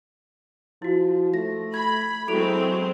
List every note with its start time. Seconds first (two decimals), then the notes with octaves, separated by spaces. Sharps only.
0.82 F3 E4 F#4
1.34 A3 A#6
1.74 B5 G#6
2.28 F#3 G#3 C4 E4 A4 D7 F7